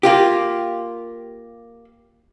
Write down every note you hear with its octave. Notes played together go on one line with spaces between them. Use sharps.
A#3 F4 G4